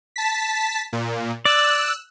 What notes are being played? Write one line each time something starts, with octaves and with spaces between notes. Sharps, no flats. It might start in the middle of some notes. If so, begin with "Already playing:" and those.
A5 B6
A#2
D5 E6 F#6